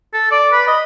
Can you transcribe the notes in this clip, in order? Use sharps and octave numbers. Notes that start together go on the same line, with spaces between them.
A4
D5
B4
D#5